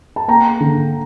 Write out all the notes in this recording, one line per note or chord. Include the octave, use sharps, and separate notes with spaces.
A5
A#3 G5 A#5
D3